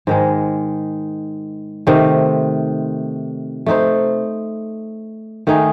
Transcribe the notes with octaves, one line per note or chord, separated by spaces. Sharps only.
G#2 D#3 G#3
C3 D#3 A3
A3 D#4 A4 C5
D#3 A3 D#4 G#4